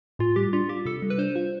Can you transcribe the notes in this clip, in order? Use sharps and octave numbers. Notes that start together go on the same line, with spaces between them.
A2 F4
G3 G4
D4 F4
F4 G4
C3 A4
G3
B4
D4 C5
F4